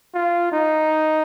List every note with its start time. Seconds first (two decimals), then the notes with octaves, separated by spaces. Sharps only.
0.14 F4
0.52 D#4